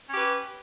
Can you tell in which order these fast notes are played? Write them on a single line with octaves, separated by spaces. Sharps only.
C#4 G4 B4